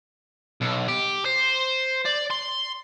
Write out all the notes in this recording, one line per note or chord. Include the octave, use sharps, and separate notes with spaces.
B1
G4
C5
D5
C6